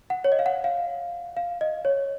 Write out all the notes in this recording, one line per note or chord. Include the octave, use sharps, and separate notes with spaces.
F#5
C#5
D#5
F5
F#5
F5
F5
D#5
C#5